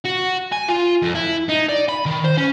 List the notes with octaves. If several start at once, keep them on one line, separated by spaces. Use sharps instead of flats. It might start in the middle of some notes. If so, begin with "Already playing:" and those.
F#4
G#5
F4
F2
E4
D#4
D5
B5
D#3
C5
C#4